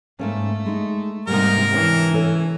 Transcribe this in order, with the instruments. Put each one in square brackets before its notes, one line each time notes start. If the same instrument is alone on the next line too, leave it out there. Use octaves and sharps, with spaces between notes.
[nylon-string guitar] G#2 A#3 C#4 [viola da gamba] A3
[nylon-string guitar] G#3 D#4
[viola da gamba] G#2 C3 D#4 [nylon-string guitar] G3 A#3 [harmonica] A#4
[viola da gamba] E3 [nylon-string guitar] D4 C#5 G5
[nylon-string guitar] C#4 A4 C#5